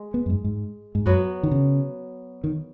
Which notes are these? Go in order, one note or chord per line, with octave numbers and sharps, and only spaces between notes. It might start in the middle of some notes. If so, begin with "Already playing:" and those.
Already playing: G#3
B3
F#2
G#2
G#2
G#2
F#2 F#3 B3 F#4
D#3
C#3
D#3